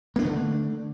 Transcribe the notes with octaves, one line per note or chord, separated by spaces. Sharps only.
D3 A3 A#3 D4